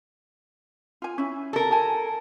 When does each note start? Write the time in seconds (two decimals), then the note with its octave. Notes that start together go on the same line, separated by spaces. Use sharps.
1.02 F4 G#5
1.18 C#4 E4
1.53 A4 A#4
1.71 G#5 A5